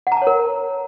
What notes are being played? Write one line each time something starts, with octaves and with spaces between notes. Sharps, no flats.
F#5
A#5
A5
C#5
A#4